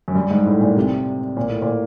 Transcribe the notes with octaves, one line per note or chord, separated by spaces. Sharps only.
F#2
G2
G#2
A2
A#2
C3
A#2
A2
A#2